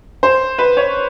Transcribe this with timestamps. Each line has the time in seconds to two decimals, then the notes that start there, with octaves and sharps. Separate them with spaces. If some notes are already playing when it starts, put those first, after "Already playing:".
0.23 C5
0.58 B4
0.77 C#5